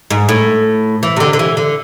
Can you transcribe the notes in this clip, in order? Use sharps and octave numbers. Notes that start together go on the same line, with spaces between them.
G#2
A2
E3
C3
D3
D3
E3
D3